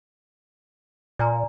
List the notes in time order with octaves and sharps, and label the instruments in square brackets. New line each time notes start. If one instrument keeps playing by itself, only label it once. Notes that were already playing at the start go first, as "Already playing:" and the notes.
[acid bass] A#2 [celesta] D5 G#5 A#5